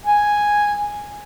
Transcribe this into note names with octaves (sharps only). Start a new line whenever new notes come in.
G#5